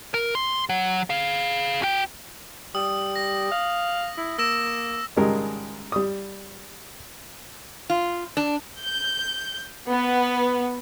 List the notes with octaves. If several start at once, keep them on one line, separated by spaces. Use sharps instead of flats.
A#4
C6
F#3
G#4 F5
F#4 G5
G3 D#6
A#6
F5
E4
A#3 E6 A#6 E7
G#1 C#3 G3 G#3 A#4
G3 D#6
F4
D4
G6
B3